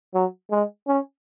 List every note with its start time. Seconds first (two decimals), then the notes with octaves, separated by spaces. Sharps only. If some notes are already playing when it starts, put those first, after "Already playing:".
0.15 F#3
0.51 G#3
0.88 C#4